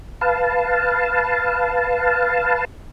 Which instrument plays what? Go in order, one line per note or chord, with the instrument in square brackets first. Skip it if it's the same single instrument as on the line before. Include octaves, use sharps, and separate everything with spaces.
[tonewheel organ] B4 F5 A5